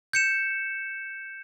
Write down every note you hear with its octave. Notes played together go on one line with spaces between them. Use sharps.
G6 C#7 E7